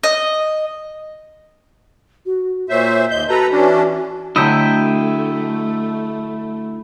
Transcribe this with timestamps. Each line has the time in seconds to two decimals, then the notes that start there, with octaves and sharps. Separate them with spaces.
0.03 D#5
2.26 F#4
2.69 A#2 C5 C#5 E5
3.10 D#2 D#5 G6
3.29 F#4 A4 B4 A#5
3.51 E3 C#4 D4
4.36 D3 F#3 A3 E4 D#5 E5 G5